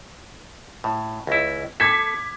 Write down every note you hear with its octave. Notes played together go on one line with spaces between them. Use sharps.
A2
C#2 E4
A4 D6 G#6 B6